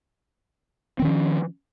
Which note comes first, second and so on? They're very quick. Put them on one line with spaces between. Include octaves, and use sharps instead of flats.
C4 D#3 C#4 F3